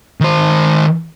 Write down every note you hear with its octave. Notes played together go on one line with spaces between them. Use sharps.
D#3 C5